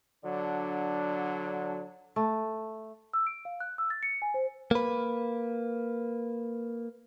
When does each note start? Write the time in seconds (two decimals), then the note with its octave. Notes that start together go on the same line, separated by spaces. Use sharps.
0.25 D3 F#3 D4
2.16 A3
3.14 E6
3.27 D7
3.45 F5
3.60 F#6
3.78 E6
3.90 A6
4.03 C#7
4.22 G#5
4.34 C5
4.71 A#3 B4